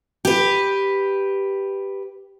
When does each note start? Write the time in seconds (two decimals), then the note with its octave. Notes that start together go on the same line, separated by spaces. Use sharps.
0.25 G4 B4